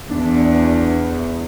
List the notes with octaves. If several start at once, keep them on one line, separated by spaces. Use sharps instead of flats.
E2 D4